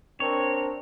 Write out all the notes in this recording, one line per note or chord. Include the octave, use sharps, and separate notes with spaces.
C4 D4 A#4 C#5